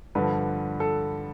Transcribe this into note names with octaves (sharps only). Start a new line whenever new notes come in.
G2 D3 F3 B4
A4